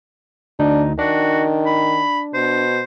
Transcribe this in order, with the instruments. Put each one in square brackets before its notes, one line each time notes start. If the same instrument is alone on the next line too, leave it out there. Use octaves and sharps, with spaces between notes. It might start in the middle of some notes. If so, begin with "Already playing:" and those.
[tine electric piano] D2 D#4 [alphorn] D4
[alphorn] D#3 [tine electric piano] D4 [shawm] F#4
[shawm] B5
[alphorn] B2 [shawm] C5